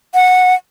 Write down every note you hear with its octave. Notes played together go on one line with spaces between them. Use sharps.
F#5